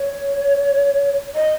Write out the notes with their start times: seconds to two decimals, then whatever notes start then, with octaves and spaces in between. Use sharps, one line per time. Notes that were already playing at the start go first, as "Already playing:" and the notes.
Already playing: C#5
1.35 D#5